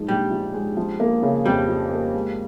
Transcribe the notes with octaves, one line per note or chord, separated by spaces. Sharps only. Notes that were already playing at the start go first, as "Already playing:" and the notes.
Already playing: G#2 F3 G#3
A#1 G3
F3
G#3
F3
A#3
C#3
F2 G3
F3
A#3
G#3